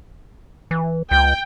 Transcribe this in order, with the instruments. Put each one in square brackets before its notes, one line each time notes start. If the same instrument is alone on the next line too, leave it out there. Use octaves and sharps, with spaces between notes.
[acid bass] E3
[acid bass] C#2 [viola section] G5